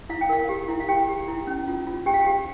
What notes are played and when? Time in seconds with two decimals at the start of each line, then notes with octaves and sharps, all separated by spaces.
0.09 E4 F5
0.21 G5
0.29 A#4 F5
0.49 G4
0.69 E4
0.80 F5
0.88 G4 G5
1.08 G4
1.28 E4
1.47 C#4
1.67 F4
1.87 F4
2.06 G4 G5
2.14 F5
2.21 G5
2.27 G4